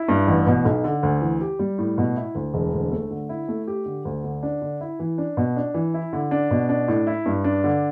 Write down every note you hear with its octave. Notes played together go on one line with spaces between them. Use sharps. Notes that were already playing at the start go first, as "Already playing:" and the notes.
Already playing: E4
G2
A1
B2
B1
D3
D2
E3
G4
G3
A2
B2
E4
D2
E1
D2
A3
D3
E4
A3
G4
D3
D2
D3
D4
D3
E4
E3
D4
B2
D4
E3
E4
D3
D4
B2
D4
A2
E4
G2
D4
D3